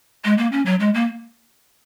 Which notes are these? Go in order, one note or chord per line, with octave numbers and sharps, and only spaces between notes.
G#3
A#3
C#4
F#3
G#3
A#3